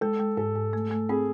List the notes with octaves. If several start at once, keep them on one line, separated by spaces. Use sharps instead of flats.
G#3 A4
G#3
G#2 A4
G#2
A3
A3
C4 G#4